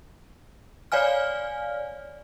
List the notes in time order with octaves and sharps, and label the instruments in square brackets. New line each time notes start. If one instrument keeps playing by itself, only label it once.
[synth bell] C#5 D5 F5 G#5 F6